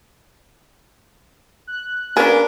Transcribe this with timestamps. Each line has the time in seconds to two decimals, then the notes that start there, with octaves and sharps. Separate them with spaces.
1.67 F#6
2.17 A#3 C#4 D4 G#4 B4